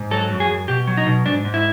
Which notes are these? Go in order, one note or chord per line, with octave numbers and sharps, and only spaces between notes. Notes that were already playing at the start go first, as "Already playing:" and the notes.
Already playing: G#2
F#3 A4
F#2
G#4
F#2
B2 G4
F#3
D#4
B2
G#2 D4
G#2
E4